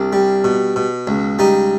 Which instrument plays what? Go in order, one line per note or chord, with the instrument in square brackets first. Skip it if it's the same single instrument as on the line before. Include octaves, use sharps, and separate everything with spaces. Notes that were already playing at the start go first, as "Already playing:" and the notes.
Already playing: [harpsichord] C2 D4
G3
B2
B2
C#2
G3 D#4